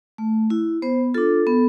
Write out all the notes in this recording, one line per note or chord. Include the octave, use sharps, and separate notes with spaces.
A3
E4
B3 C5
D4 F4 A4
B3